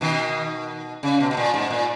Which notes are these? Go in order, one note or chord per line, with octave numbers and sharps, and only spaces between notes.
B2 D#3
C#3
B2
B2
A#2
G#2
A#2